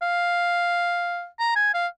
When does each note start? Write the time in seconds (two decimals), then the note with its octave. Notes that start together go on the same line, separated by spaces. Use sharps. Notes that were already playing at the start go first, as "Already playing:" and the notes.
0.02 F5
1.40 A#5
1.56 G#5
1.74 F5